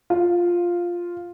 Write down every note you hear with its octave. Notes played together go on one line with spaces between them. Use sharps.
F4 F5